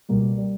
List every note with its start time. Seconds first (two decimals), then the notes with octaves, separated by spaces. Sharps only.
0.09 C#2 B2 G3 A#3
0.38 G3